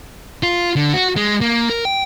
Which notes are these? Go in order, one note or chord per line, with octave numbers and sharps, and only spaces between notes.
F4
D3
F#4
G#3
A#3
A#4
G5